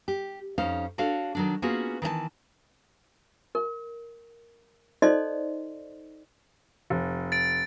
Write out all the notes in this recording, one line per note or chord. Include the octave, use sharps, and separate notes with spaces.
G4
F2 C#4 D#4 C5 F5
D4 F#4 A4 C#5 F5
D#3 F#3 D4
A#3 B3 C#4 F4 F#4 G#4
D#3 E3 D#5 A5
A#4
D#4 A4 C5 D5 D#5 C6
F1
A6 D7